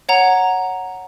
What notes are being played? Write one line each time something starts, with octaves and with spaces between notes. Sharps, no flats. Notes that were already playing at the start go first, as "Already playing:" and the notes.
C#5 F#5 A#5